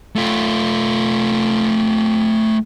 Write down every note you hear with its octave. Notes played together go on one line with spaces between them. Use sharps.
A3 F4